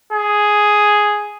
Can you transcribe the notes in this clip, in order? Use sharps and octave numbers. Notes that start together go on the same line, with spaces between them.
G#4